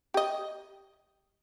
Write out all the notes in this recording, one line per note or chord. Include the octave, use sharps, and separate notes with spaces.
G4 D#5